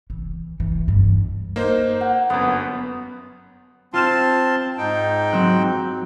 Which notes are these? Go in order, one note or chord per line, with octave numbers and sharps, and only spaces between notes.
E3
E3
G2
A#3 D#4 C5
F#5
G1 F#2 B3
C4 F4 A5 C6 F6 E7
G#2 D#4 G5
F#3 C4 F#6